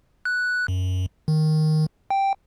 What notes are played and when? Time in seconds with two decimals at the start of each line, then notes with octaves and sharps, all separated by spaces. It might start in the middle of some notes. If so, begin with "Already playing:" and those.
0.25 F#6
0.68 F#2
1.28 D#3
2.10 G5